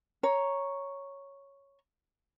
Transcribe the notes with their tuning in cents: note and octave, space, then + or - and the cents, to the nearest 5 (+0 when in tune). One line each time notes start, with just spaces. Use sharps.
C#5 +0 A#5 +5